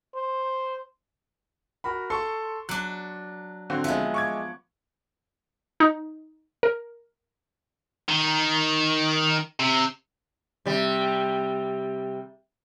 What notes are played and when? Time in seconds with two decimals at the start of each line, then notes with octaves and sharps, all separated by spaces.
0.15 C5
1.84 F#4 A#4 B5
2.10 A4 C6 C#6
2.69 F#3 D4 F#6
3.70 D3 C4 F#4
3.84 F3 G#3 B3 E5
4.14 C#6 D6 G#6
5.80 D#4
6.63 A#4
8.09 D#3
9.60 C3
10.66 C3 G3